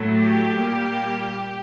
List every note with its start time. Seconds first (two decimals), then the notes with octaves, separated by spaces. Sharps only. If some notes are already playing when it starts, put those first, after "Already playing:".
Already playing: A2 F#3 A3
0.17 G4
0.56 A#2 G3 A#3